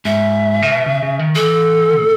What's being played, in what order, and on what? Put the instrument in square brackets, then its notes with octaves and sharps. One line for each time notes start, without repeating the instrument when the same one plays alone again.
[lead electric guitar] G#2 [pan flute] E5
[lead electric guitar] C#3
B2
C#3
C#3
D#3
[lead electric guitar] E3 [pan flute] A4
[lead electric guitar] A2